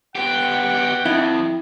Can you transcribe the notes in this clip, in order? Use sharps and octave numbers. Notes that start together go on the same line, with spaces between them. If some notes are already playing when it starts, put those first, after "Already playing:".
B3 G4 F#5 G5
F2 E4